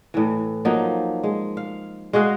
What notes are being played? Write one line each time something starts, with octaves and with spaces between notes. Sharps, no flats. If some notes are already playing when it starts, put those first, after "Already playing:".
A2 E3
F3 F#3 A#3 D#4
G#3
F5
G#3 F#4 D#5 F5